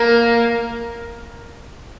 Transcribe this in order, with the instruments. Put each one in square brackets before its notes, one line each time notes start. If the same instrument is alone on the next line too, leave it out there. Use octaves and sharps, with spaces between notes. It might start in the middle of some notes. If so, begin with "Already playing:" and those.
Already playing: [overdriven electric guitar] A#3 [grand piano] A#4